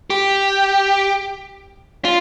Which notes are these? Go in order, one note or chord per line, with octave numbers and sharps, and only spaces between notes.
G4
F4